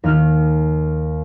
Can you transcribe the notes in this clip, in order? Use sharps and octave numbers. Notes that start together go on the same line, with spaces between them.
D#2 F6